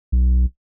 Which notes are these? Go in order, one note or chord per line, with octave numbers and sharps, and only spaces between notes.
B1